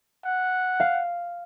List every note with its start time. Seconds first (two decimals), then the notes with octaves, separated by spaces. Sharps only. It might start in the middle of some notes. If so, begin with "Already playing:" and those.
0.24 F#5
0.80 F5